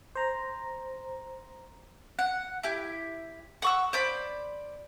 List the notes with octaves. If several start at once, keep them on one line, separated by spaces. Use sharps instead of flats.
C5 A#5
F#5
E4 G4
F#5 C#6 E6
C5 D5 B5